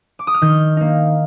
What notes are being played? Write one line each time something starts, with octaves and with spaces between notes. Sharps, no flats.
D6
D#6
F6
D#3 G6
A#3 D#4